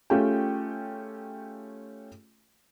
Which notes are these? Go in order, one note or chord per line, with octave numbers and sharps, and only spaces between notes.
A3 C#4 F4 G4 G#4 G5